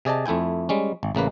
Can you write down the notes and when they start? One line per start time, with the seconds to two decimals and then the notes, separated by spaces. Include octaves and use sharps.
0.05 C3 G#4 D5 D#5 A5
0.26 F2 A3 E4 G5 G#5
0.69 G3 G#3 C#4
1.03 G#1
1.15 A1 C#3 A#3 B4